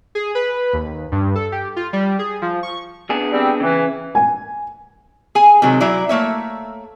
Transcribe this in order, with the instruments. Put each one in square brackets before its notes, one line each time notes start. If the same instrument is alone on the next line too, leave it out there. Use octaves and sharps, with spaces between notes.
[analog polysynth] G#4
B4
D#2
G2
A4
G4
F4
G3
G#4
F3
C#6
[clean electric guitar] B3 D4 G#4
[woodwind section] G3 C4
[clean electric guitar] C#3 [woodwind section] E3
[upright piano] G#5
[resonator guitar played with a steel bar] G#4 G#5
C3 D#3 F#3 G#3
F#3 E4 D5
A3 A#3 C#5 E5